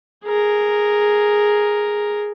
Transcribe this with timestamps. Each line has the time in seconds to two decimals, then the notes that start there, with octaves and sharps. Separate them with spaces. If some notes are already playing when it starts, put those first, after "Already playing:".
0.25 G#4 A#4